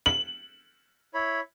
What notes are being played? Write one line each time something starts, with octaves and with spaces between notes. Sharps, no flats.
F#7
E4 C#5 B5